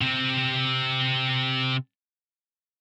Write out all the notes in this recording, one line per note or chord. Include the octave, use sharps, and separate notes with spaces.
C3 C4